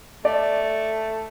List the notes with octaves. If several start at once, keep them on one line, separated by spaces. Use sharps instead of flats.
A3 D5